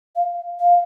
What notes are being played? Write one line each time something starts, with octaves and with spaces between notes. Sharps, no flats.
F5
F5